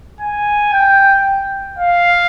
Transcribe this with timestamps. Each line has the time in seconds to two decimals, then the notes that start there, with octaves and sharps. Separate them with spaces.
0.21 G#5
0.73 G5
1.79 F5